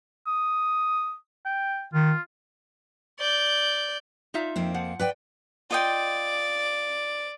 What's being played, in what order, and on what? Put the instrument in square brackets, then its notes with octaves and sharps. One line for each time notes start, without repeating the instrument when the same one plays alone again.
[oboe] D#6
G5
[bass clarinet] D#3 [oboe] F4
[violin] D5 G6
[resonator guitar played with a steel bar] D#4 F4 E5
[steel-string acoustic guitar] F2 A#3 C4
[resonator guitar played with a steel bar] F3 F#5
[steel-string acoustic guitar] B4 D5 G5
[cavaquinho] F4 D#5 G5 [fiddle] D5